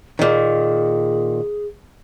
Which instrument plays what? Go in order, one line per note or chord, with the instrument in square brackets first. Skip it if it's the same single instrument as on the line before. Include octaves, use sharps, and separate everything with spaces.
[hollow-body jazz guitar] A#2 D#3 [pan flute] G#4